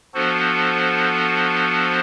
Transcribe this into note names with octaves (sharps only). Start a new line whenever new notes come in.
F3 B3 D4 F#4 A4 C5